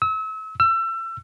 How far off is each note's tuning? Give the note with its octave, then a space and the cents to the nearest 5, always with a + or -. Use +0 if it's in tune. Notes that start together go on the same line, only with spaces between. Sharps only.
E6 -35
E6 +30